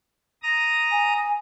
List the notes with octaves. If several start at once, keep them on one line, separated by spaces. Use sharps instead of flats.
A#5 D#6 A#6
G#5